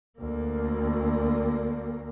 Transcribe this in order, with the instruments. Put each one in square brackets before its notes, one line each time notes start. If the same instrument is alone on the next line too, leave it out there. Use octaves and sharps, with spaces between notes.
[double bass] D2 A#3